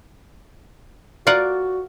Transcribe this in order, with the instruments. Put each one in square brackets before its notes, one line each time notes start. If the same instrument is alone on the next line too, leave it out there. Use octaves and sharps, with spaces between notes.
[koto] F4 A#4 F#5 [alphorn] F#4 [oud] D5